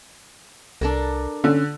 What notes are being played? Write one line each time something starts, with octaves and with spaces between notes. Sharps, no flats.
C2 D4 A4 A#4
D3 C#4